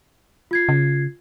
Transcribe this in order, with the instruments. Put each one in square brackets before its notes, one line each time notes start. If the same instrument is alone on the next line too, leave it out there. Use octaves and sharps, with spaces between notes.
[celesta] F4 G#6 C7
[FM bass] C#3